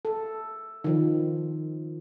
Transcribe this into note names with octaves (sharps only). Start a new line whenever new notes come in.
A4
D#3 F3